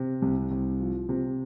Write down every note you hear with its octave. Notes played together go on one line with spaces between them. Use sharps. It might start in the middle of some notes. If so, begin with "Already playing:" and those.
Already playing: C3
C2
C2
F3
C3